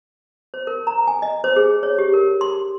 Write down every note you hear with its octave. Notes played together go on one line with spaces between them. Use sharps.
C5
A#4
A#5
G#5
D#5
C5
G#4
C#5
G4
A#4
C6